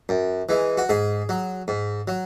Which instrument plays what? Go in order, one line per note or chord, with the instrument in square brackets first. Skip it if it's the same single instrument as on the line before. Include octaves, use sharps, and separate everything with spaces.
[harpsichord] F#2
E3 G#3
F#4
G#2 G#4
F#3
G#2
F#3